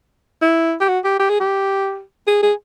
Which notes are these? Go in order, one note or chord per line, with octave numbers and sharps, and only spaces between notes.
E4
G4
F#4
G4
G4
G#4
G4
G#4
G#4